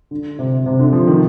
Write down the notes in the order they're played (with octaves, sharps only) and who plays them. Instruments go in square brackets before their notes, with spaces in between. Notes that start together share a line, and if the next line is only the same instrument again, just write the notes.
[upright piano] D3
C3
C3
D3
F3
D#3